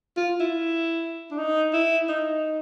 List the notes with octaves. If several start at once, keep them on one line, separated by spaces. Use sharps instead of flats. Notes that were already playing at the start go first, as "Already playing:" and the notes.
F4
E4
D4
D#4
E4
D#4